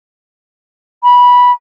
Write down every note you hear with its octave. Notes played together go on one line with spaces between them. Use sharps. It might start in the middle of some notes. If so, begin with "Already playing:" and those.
B5